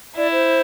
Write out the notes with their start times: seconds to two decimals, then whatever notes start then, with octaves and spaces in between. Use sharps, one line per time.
0.17 E4 D5
0.32 C5